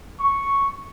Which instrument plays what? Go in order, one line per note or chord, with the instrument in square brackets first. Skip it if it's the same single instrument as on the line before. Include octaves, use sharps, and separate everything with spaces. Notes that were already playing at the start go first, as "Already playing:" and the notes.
[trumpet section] C#6